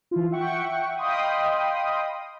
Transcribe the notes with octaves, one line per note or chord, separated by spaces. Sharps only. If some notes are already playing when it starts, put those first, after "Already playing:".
E3 E4 F4
E5 F#5 G5 C#6
D#5 F5 G5 B5 C6 D#6